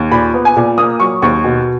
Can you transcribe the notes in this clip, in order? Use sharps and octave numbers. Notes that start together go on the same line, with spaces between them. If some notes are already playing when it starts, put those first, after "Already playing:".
Already playing: D#2
A#2 B5
B3
G#5
A#2
A#3 D#6
F#3 C#6
D#2 C#6
B2